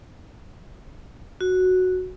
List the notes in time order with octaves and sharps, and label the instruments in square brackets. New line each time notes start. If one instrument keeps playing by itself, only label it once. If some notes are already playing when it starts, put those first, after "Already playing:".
[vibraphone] F#4